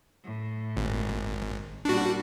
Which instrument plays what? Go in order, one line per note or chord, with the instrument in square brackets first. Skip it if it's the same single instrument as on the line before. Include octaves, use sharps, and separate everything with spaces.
[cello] A2
[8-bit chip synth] G#1
[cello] A#2 G3 [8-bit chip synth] D4 F#4